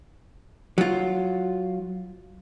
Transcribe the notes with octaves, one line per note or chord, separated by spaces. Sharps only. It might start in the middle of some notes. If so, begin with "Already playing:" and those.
F#3 F4